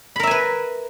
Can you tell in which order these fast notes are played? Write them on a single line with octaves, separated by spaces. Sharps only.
B5 A#4 E5 G#5 B4